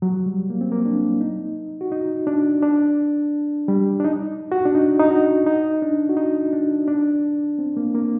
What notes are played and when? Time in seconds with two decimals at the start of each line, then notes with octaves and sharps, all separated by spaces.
0.02 F#3
0.26 G3
0.50 A#3
0.61 C4
0.72 A#3
0.85 D4
1.21 D#4
1.81 F#4
1.92 D#4
2.27 D4
2.62 D4
3.68 G3
4.00 D4
4.04 D#4
4.52 F#4
4.65 D4
4.75 D#4
4.99 D#4
5.11 F#4
5.46 D#4
5.82 D4
6.09 F#4
6.17 D#4
6.53 D4
6.87 D4
7.59 C4
7.77 A#3
7.94 A#3